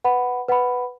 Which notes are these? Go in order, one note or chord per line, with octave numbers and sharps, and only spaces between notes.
B4 F#5 B5
B4 F#5 B5